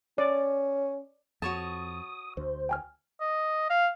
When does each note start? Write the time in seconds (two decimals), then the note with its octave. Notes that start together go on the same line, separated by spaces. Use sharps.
0.18 C#4 D5
1.42 F2 F#4 C#5 A5 D#6
2.37 D2 C5
2.69 G5 G#5 F6
3.20 D#5
3.70 F5